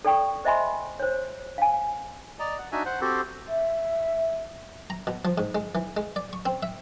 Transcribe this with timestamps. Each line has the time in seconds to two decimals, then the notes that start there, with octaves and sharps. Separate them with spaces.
0.05 A4 D5 G5 C#6 D#6
0.45 C5 D#5 E5 G#5 B5 C6
1.00 C5 C#5
1.58 F5 G#5
2.40 D5 D#5 A#5
2.58 F#5
2.72 D4 D#4 F#4 E5 G#5
2.85 C5 F#5
3.01 C4 F#4 G4 A4 C5
3.48 E5
4.90 A#5
5.07 B2
5.25 F3
5.38 G#2
5.55 G#3
5.75 E3
5.97 G#3
6.16 D5
6.33 C#6
6.46 C4
6.63 E5